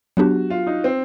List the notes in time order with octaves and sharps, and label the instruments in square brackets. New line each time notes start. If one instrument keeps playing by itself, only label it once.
[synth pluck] F#3 B3 D4 G4 [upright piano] F#4
[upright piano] F4
D#4
C4